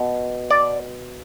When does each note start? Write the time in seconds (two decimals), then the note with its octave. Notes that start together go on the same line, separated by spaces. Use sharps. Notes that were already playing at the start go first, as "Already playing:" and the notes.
Already playing: B2
0.51 D5